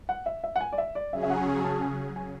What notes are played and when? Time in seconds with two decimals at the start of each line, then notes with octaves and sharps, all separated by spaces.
0.09 F#5
0.26 E5
0.44 E5
0.56 F#5
0.61 G#5
0.73 D5
0.78 E5
0.95 D5
1.12 C#3 F#3 C#4 G#4 E5
1.23 E5
1.30 F#5
1.47 G#5
1.60 G#5
1.64 A5
1.81 G#5
2.16 G#5